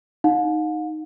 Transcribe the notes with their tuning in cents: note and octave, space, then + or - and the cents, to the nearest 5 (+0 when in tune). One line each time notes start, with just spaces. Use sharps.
D#4 +0 F5 +45